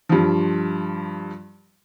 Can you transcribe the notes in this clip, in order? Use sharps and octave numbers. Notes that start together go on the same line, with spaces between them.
G2 F3